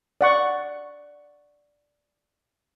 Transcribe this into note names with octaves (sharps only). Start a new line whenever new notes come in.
D5 F#5 C#6